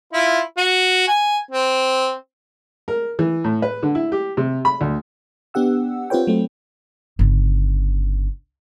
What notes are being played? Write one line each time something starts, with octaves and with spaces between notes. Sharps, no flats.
E4 F4
F#4
G#5
C4
A#4
E3
A2
B4
D3
E4
G4
C3
B5
D2
B3 D4 G4 F#5 E6
C4 F4 G4 B4 C#5 G5
F#3 A3 C4
G1 C#3